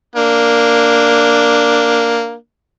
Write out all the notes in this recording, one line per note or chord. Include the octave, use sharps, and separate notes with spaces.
A#3 D4